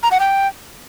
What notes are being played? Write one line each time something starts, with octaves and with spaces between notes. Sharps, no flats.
A#5
F#5
G5